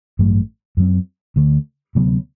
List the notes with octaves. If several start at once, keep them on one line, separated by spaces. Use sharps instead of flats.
A1 G2 F#3 A3
F#2 F#3 C4
D2 D3 A3
D2 C3 F#3 B3